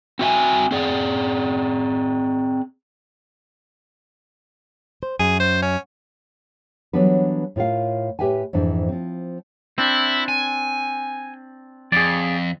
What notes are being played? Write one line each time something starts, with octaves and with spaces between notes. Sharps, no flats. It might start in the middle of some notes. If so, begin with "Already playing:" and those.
C4 F#4 E5 G#5
C4 G#4 D5
C5
F#2 G#4
C5
C#4
E3 F#3 G3 B3 D4 B4
A2 F4 A#4 F5
A2 G4 B4 E5 G5 G#5
F2 G#2 E3 D4
F3 C4
C4 D4 E4
G#5
F2 G#4 D5